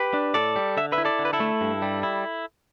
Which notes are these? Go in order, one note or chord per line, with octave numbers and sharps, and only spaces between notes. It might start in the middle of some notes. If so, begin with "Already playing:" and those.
Already playing: G4 B4
D4
A2 A4 D5
G3
D3 E5
B4 E5
E4
A4 D5
D3
B4
E4 A4
A3
G2
G3
E4